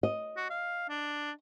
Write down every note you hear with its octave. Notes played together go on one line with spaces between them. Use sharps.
D#5
F#4
F5
D4